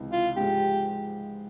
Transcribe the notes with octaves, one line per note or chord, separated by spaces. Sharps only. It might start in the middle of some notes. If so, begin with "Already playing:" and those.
Already playing: C#2 C3 E3
F4
G#2 F3 G#3 G4